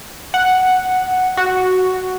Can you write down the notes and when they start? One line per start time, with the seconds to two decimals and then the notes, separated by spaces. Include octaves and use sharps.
0.34 F#5
1.37 F#4